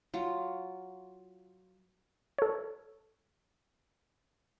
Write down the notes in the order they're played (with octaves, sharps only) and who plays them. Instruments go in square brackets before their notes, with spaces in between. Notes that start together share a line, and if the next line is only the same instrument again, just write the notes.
[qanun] F#3 F4
[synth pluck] A4 C#5